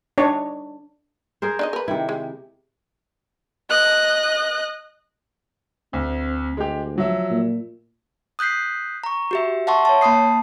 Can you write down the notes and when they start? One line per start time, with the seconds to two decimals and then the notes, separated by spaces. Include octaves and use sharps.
0.18 D4 D#4 C#5
1.42 G#4 A#4 C5
1.59 D4 D#4 D#5
1.73 A#4 B4
1.88 C3 D#3 E4
2.09 G#3
3.70 D#5 F#6
5.93 D2 C4
6.57 D2 G#3 G4
6.96 F3 F#3 E5
7.31 A#2
8.39 D#6 F#6 G6 B6 C7
9.04 A#5 C#6
9.31 F#4 G4 E5
9.67 E5 F#5 A5 C6 C#6
9.85 C#5 A5
10.01 A#3 A5 B5 D#6 C7